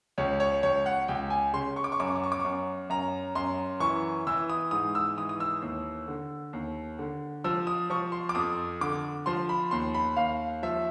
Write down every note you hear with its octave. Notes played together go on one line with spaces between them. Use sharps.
C#2 C#5
C#5
C#2 C#5
F#5
C#2 G5
G#5
C#3 C6
C#6
D6
C#6
F#2 D6
C#6
D6
C#6
D6
F#2 C#6
F#2 A#5
F#2 C6
E3 C#6
E3 E6
D#6
G#2 D#6
E6
E3 D#6
D#6
E6
D#2
D3
D#2
D3
F3 E6
D#6
F3 C#6
C6
D6
F2 D#6
D3 D6
F3 C6
B5
D#2 C6
B5
D#2 F5
F3 E5